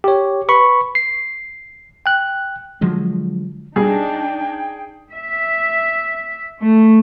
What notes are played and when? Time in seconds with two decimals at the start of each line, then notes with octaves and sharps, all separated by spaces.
0.04 G4 C#5
0.49 B4 B5 C#6
0.95 C7
2.06 G5 F#6
2.81 D3 F3 F#3 G#3
3.76 B2 G3 D4 D#4 G#4 G5
5.14 E5
6.63 A3